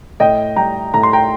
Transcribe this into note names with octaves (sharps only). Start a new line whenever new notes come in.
A2 D#5 G5
G3 G5 A#5
A2 A#5
C6
G5 A#5